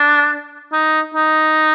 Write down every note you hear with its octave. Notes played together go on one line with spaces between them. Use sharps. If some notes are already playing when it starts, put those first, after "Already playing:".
Already playing: D4
D#4
D#4